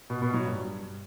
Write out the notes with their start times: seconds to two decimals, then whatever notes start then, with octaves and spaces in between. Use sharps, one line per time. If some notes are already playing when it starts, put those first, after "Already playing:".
0.10 B2
0.22 B2
0.34 F#3
0.46 G2